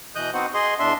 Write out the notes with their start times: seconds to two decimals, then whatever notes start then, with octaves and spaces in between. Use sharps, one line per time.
0.15 B2 E3 D#5 D#6 F#6 G6
0.33 B3 C4 D#4 F#4 C5 F#5
0.54 G#4 D#5 C6
0.79 E2 D4 E5 C6